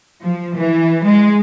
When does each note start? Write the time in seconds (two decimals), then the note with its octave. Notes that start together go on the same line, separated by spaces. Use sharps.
0.21 F3
0.56 E3
1.03 G#3